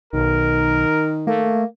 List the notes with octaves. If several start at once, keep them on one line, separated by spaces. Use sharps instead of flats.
B1 D#3 A#4
A3 A#3